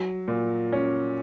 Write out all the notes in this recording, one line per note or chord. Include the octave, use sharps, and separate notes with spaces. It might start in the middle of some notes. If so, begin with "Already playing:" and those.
Already playing: F#3
A#2
C#4